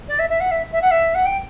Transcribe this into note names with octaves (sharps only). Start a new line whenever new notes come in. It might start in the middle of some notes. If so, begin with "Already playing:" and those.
D5
E5
E5
F#5
E5
E5
F#5
E5
F#5
G5